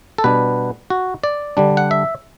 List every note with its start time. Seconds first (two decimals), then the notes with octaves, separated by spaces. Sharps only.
0.18 A4
0.24 B2 G3 B3 D4 B4
0.90 F#4
1.24 D5
1.57 D3 G3 D4
1.77 F#5
1.91 E5